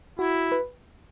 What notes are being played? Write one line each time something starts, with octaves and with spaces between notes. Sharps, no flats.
E4 F#4
B4